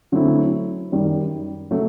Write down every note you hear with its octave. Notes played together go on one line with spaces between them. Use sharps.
D3 F#3 A3 C4 E4
F#2 D#3 G3
C#3 F#3 A3